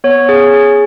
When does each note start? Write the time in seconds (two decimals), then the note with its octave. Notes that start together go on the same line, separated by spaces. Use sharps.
0.04 B3 C#5
0.29 G#4
0.53 G#4